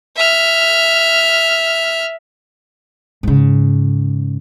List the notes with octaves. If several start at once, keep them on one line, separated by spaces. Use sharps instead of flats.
E5 F6
G#2 C#3